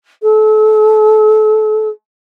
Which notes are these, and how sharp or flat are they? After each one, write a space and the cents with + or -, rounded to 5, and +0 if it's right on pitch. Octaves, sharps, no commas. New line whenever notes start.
A4 -30